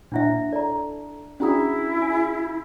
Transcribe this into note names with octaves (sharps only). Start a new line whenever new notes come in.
A#2 D4 E4 E5 F#5
A4 D5 A#5
C#4 D4 E4 F#4 G#4 A#5 D#6
G#5